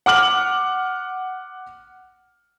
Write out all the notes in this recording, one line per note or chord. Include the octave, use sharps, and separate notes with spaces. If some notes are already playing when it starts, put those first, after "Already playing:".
F#5 D6 F6 F#7